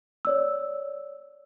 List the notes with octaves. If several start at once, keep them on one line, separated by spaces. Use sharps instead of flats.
C#5 D5 E6